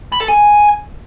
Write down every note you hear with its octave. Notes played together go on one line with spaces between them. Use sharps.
B5
A4
G#5